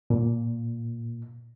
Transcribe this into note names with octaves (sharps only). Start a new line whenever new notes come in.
A#2